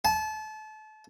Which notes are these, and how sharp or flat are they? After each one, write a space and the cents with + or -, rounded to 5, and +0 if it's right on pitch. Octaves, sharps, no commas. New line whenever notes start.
A5 -30